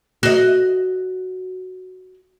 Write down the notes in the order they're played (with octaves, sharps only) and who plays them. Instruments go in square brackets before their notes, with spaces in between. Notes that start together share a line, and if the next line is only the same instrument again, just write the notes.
[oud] F#4 D#5